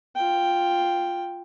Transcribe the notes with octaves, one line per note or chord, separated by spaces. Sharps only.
F4 G5